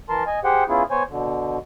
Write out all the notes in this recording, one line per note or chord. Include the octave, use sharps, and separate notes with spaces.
E3 A#4 A5 C6
D#5 G#5
G4 G#4 C5 F#5 G5
B3 C#4 E4 F4 G#4
B3 C5 C#5 G#5
B2 D3